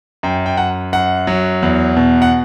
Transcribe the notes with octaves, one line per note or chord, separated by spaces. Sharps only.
F#2 G5
G5
F#2 F#5
F#2 F#5
F#3
E2
B2
F#5